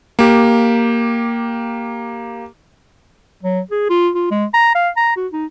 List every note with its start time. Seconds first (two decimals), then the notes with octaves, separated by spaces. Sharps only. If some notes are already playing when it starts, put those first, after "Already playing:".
0.19 A#3 G4
3.43 F#3
3.71 G#4
3.90 F4
4.15 F4
4.31 G#3
4.54 A#5
4.75 F5
4.96 A#5
5.16 F#4
5.32 D#4